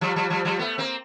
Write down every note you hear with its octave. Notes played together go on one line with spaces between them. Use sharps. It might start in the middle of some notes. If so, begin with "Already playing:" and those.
F3 G3
F3 G3
F3 G3
F3 G3
A3 B3
A#3 C4